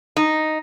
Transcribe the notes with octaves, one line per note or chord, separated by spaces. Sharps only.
D#4